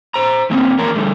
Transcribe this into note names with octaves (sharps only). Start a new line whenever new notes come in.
C5 A#5
A2 A#3 C4 C#4
E2 A#3 D4 A#4 C#5 A#5
D3 G3 A3